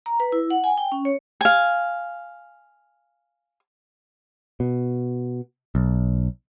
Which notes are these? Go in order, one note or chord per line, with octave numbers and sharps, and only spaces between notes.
A#5
B4
E4
F#5
G#5
G5
C#4
C#5
F5 G#5
B2
B1